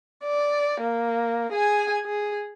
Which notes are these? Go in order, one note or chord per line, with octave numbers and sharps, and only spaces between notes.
D5
A#3
G#4 G#5
G#4